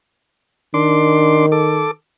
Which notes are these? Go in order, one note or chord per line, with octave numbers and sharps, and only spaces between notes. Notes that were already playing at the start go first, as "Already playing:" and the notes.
D#3 D4 C6 D6
A4 D6